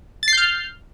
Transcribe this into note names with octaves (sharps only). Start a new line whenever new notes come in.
F6 G6 A6 C7